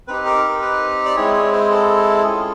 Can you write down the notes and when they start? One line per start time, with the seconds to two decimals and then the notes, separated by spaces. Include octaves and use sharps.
0.08 C4 D#4 G4 B4
0.26 A#4
0.44 A#4
0.62 B4
1.06 D5
1.16 G#3 C4 E4 G#4 C#5
1.34 C#5
1.52 C5
1.70 A4
2.24 C#4 F4 G#4